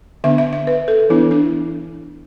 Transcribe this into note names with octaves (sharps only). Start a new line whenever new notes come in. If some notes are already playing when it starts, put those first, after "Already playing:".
D3 B3 D4 E5
E5
E5
B4
A4
E3 B3 D4 E4
D4